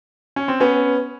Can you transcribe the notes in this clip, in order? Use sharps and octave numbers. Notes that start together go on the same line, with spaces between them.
C#4
C4
B3 C#4